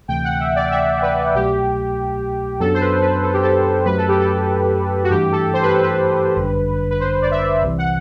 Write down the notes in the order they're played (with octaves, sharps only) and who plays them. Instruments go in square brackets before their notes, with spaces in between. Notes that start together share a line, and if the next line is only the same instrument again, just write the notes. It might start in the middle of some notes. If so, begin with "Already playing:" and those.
[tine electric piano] D2 C3 E3 A3 [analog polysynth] G5
[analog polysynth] F#5
E5
D5
E5
B4
[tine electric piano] C2 B2 F#3 A3 [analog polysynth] G4
[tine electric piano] F#2 F#3 B3 D4 [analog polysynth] A4
[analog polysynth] C5
B4
B4
A4
G4
A4
[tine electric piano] F#2 F#3 A3 [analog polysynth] B4
[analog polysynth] A4
G4
A4
F#4
[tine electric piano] G2 E3 A3 E4 [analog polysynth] G4
[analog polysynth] A4
C5
B4
A4
B4
[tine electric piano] G1 F#2 D3 G3 D4
[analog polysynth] B4
C5
D5
E5
[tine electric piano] C2 C3 E3
[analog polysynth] F#5